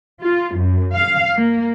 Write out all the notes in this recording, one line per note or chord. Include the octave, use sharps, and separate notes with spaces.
F4
F#2
F5
A#3